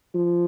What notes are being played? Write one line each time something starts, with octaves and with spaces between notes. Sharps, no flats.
F3